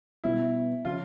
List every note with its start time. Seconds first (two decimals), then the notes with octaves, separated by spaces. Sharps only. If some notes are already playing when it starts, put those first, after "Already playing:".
0.24 B2 G3 B3 E4
0.85 C#3 F3 F4